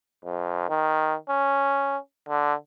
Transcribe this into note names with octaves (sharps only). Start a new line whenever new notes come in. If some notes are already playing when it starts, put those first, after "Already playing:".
F2
D#3
C#4
D3